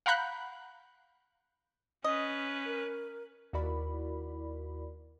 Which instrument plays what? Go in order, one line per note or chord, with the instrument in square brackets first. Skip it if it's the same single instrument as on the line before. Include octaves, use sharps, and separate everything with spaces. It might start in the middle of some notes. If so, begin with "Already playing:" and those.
[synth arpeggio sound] F5 F#5 A#5 B5 F#6 G6
[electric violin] C#4 B4 [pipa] D#5
[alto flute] A#4
[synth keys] D#2 E4 F#4 A#4 D5 B5